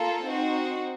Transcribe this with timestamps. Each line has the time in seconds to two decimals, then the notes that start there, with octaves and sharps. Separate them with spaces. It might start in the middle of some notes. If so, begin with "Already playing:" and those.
Already playing: A#3 F4 A4
0.25 C4 D#4 F#4